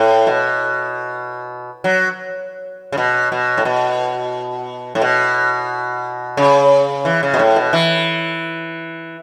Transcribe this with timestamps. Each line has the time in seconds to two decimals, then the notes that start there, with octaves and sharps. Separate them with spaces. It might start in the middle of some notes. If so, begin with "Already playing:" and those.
Already playing: A2
0.27 B2
1.84 F#3
2.92 C#3
2.98 B2
3.32 B2
3.58 A2
3.65 B2
4.95 A2
5.01 B2
6.37 C#3
7.05 E3
7.23 C#3
7.34 B2
7.39 A2
7.56 B2
7.73 E3